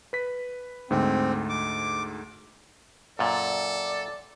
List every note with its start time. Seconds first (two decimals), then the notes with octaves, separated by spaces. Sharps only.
0.13 B4 B6
0.91 D2 G#2 C4
1.49 D6
3.19 F#2 A#2 A4 D5